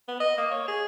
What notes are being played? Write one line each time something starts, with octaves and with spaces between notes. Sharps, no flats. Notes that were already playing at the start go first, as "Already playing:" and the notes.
B3
D#5
A#3
C#5
G#4